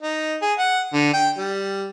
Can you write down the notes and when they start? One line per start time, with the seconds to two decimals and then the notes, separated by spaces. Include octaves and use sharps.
0.01 D#4
0.42 G#4
0.58 F#5
0.94 D3
1.13 G5
1.38 G3